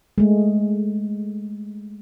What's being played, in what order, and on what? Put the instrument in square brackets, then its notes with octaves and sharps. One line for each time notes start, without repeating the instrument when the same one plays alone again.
[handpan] G#3 A3